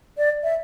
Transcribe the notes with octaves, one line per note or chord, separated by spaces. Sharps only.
D5
E5